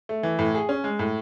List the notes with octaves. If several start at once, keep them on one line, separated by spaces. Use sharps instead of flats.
A3
E3
A2
G#4
C#4
G#3
A2